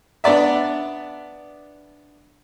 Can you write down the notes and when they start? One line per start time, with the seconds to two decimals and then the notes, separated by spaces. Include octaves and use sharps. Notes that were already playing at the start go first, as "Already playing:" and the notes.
0.24 B3 D4 D5 E5